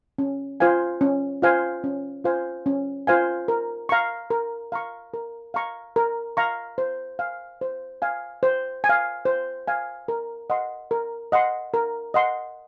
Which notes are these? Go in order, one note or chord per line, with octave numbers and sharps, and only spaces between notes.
C#4
F4 C5 F5 G#5
C#4
F4 C5 F5 G#5
C#4
F4 C5 F5 G#5
C#4
F4 C5 F5 G#5
A#4
F5 A#5 C#6
A#4
F5 A#5 C#6
A#4
F5 A#5 C#6
A#4
F5 A#5 C#6
C5
F5 G#5
C5
F5 G#5
C5
G#5
F5
C5
F5 G#5
A#4
D#5 F#5 C6
A#4
D#5 F#5 C6
A#4
D#5 F#5 C6